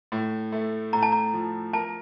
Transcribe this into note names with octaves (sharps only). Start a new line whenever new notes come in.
A2
A3
A2 A#5
A5
A#5
F3
A#4 A5